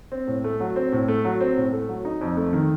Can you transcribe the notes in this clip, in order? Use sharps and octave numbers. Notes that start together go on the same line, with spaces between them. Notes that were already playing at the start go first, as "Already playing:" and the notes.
C4
A2
A3
F#3
C4
A2
A3
F#3
C4
A2
A3
F#3
D#4
F2
A3
D#3